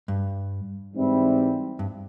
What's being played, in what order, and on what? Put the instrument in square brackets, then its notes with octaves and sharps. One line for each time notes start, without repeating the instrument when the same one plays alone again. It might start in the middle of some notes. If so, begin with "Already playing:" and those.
[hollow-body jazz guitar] G2
[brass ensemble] G#2 E3 G3 C4 E4
[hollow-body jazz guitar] G2